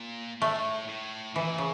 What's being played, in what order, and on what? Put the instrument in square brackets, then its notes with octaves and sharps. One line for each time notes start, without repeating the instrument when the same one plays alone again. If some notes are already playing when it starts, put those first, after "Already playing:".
Already playing: [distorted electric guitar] A#2
[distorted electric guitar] A2 [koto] A3
[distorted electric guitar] A2
[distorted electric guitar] A#2 [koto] E3
[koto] C#3